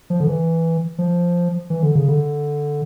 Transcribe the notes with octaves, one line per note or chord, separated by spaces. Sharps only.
F3
D3
E3
F3
E3
D3
C#3
D3